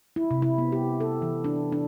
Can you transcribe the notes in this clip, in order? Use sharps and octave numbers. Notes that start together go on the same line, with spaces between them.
E4
C3
E4
B3
G4
A4
E3
D4
D4